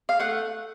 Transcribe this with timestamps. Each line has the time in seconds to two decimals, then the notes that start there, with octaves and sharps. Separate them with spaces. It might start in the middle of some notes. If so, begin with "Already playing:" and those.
0.09 F5
0.19 A3 F#5